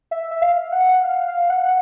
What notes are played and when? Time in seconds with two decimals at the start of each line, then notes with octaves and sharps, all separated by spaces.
0.11 E5
0.31 E5
0.42 F5
0.72 F#5
1.04 F5
1.27 F5
1.50 F#5